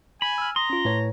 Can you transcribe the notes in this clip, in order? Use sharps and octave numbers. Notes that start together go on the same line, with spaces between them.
G#5 B5
E6 F6
A#5 C6 D#6
C#4 F4
A2 B4 C#5